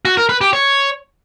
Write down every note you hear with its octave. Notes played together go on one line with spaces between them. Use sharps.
F#4
A#4
B4
G4
C#5